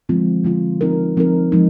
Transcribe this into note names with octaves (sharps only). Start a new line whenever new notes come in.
D3 F3 G#3 C4 F4
D3 F3 G#3 C4 F4
F3 C4 D#4 A#4
F3 C4 D#4 A#4
F3 G#3 D#4